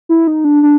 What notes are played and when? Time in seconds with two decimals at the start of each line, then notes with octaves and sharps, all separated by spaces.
0.09 E4
0.27 D#4
0.45 D4
0.63 D4